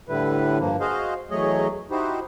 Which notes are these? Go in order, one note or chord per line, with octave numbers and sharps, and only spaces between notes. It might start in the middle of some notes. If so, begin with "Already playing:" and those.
A2 D3 G3 E4 B4
G2 F3 A#3
F#4 G#4 C5 D#5 F5
E2 F#3 A3 G#4 C#5 D#5
D#4 E4 F#4 G4 C5